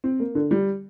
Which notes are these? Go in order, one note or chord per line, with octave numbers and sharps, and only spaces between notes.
C4
A#3
D3
G3